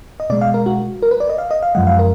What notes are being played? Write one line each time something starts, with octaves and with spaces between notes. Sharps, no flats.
D#5
B2 G#3 D5
F5
A#4
F#4
A#4
B4
D5
D#5
F5
D#5
F5
F#2 F3 G#3 F#5
F5
A#4